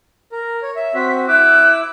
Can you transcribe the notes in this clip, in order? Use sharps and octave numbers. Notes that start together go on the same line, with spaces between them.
A#4
C#5
E5
C4 F#4 B6
E4 D6 E6 F#6